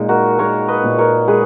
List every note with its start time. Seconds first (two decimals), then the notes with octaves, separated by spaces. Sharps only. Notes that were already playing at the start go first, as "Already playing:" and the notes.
Already playing: A#2 G#3 D#4
0.09 F#4 A#4
0.39 G#3 A#4 C#5
0.68 B4 D#5
0.84 A#2
0.99 A#4 C#5
1.28 G#3 G#4 B4